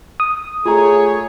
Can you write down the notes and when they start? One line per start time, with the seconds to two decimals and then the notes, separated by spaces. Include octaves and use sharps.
0.20 D#6
0.66 A3 F4 G#4 C#5 A#5